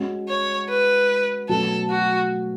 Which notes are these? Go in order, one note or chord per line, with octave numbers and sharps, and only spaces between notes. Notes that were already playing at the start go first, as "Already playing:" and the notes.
Already playing: G#3 C#4 F#4
C#5
B4
B2 F#3 A3 C#4 A4
F#4